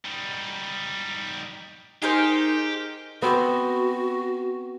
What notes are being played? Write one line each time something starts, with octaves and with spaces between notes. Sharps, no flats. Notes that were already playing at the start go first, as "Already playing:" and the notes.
G3 D#4
D#4 G4 G#4 A#4 C5
B3 C4 F#4